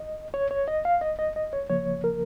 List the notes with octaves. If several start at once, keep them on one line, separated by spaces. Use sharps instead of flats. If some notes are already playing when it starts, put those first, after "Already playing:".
Already playing: D#5
C#5
C#5
D#5
F5
D#5
D#5
D#5
C#5
C#3 F3 A#3 C#5
A#4